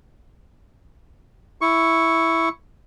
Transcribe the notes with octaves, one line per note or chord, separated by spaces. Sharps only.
E4 C#6